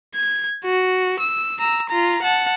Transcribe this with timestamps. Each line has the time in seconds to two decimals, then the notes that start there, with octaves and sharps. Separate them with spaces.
0.14 G#6
0.65 F#4
1.20 E6
1.59 A#5 E6
1.90 F4 A#5
2.23 F#5 A5